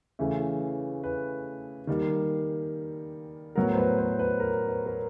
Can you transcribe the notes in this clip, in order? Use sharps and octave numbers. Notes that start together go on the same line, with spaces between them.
C#3 E3 A3 E5
B4
D#3 G3 A#3
A2 F#3 B3 A#4
C5
B4
C5
B4
A#4
B4
A#4